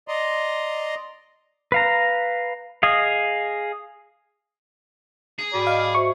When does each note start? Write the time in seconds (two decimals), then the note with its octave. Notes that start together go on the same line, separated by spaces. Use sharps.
0.08 D5 D#5 A#5 C6
1.72 B4 F5 A#5
2.83 G#4 D#5 F5
5.39 G#4
5.54 G#2 F#4 D5 B5
5.67 D#5 F5
5.95 F#4 C5 E5 C#6